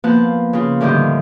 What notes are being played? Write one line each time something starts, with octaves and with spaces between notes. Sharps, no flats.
F3 A#3 B3 A5 F#6
C#3 F4
A2 D3 D#3 F3 G3 G4